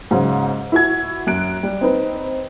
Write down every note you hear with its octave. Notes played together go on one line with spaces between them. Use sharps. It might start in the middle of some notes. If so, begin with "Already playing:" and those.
G#2 C#3 F#3
E4 F#4 G#6
F#2 F#6 D7
G3 G4
C4 D#4 B4